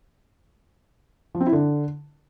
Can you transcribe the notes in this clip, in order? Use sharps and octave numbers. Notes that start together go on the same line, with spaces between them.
F3
C4
E4
D3